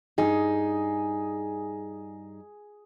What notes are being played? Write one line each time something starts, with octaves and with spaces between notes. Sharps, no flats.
G2 D#4 G#4